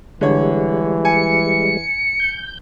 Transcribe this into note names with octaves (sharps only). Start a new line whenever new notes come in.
D3 E3 G3 G#3 C#5
G#5 C#7
G6